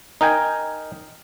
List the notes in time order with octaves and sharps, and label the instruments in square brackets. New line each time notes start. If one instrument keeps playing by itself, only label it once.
[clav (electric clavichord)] D#4 A#4 G5 G#5